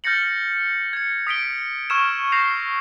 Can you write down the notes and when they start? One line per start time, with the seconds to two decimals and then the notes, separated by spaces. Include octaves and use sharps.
0.04 F6 G6 A6 A#6 C#7 F#7
0.93 G#6 C#7
1.27 D#6 B6 D7 G7
1.90 C#6 E6 F6 G#6 E7
2.32 G6 A#6 C7 E7 F7